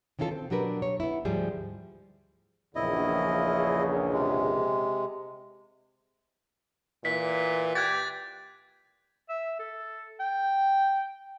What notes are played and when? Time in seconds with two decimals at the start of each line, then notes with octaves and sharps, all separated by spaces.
0.19 D#3 E3 C#4 F4 A4
0.31 C4
0.50 B2 F#3 D4 G4 A#4 B4
0.82 C#5
1.00 B3 E4
1.25 D2 G#2 F3 G3 G#4
2.75 A#1 E2 C#3 E4 D#5
4.13 C3 G#3
7.05 A#2 E3 B6
7.75 G4 F#6 G#6 A6
9.28 E5
9.59 A4
10.19 G5